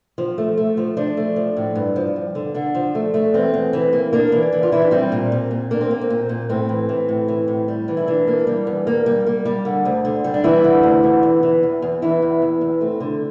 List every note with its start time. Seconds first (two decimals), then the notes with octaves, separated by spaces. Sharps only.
0.18 F3
0.38 A3
0.58 A3
0.77 F3
0.97 F3 D4
1.17 A3
1.36 F3
1.57 A2
1.75 G2
1.96 F3
2.16 G2
2.35 D3
2.55 D3 D4
2.75 F3
2.95 A3
3.14 A3
3.34 E2 C4
3.54 E2
3.73 E3
3.93 A#3
4.13 A#3 D4
4.32 E3
4.53 E3
4.63 F4
4.72 E3 E4
4.82 D4
4.91 G3 C4
5.12 A#2
5.32 A#2
5.51 A#2
5.71 A#3 D4
5.81 C4
5.91 A#3
6.01 C4
6.10 A#2
6.29 A#2
6.49 A2 C4
6.69 E3
6.89 E3
7.09 A2
7.28 E3
7.48 A2
7.68 G3
7.88 E3
7.97 E4
8.07 E3 D4
8.27 A#3
8.47 G3
8.67 E2
8.87 A#3
9.06 G3
9.27 A#3
9.45 G3
9.65 D3
9.85 D2
10.05 D3
10.24 G3
10.34 D4
10.44 E3 G3 E4
10.64 D3
10.83 D2
11.03 D3
11.23 E2
11.43 E3
11.63 E2
11.82 E2
12.02 E2 E3 E4
12.22 E2
12.42 E2
12.61 E2
12.81 A3 C4
13.00 D3